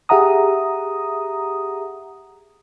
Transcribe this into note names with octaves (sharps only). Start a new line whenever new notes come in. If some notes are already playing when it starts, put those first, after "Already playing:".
G4 G#4 E5 F#5 A#5 D#6